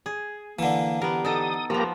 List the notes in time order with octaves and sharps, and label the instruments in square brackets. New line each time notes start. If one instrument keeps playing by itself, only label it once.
[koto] G#4
[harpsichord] D3 E3 [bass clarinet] A#3
[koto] B3 A#4 [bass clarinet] G4
[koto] D#4 A4 [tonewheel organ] D#6
[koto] F3 B3 [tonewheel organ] A#3 G4 A#5